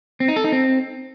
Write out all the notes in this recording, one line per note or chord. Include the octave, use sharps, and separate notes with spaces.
C4
D#4
A4
D#4
C4